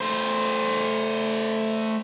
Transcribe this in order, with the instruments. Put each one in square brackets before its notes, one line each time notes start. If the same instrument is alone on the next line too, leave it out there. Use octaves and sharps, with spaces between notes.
[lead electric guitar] A3 C5